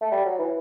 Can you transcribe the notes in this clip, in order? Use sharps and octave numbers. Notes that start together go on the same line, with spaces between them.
A3
G3
F#3
E3